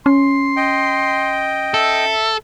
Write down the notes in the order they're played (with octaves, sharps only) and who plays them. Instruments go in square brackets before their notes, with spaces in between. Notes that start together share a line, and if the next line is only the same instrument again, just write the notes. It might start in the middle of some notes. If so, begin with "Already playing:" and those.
[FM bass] C#4 [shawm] C6
[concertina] D#5 G5
[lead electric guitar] A4 [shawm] E5